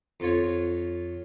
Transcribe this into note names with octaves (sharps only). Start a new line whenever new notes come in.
F2 F4 C#5